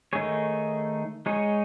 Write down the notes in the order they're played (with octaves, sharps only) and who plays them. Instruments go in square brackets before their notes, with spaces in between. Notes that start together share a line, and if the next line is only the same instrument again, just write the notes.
[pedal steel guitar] D#3 A3 D#4 G#4 C#5
G#3 D#4 G#4 C#5